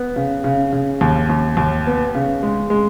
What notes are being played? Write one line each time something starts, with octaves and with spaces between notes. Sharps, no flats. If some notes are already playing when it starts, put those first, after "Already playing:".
Already playing: B3
C#3
C#3
C#3
D#2
D#2
D#2
B3
C#3
G#3
G#3